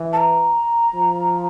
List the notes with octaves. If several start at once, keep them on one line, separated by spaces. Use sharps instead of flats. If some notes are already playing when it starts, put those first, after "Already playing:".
Already playing: E3
A5
A#5
F3